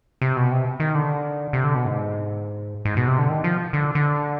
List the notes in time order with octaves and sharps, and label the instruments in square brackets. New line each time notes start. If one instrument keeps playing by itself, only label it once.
[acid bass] C3
B2
C3
D#3
D3
C3
D3
B2
G#2
G#2
B2
C3
D3
D#3
F3
D3
D3